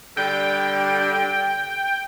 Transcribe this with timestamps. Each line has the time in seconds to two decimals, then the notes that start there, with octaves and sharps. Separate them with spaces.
0.17 D3 G3 G5